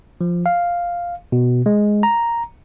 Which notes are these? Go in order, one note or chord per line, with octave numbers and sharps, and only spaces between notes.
F3
F5
B2
G#3
A#5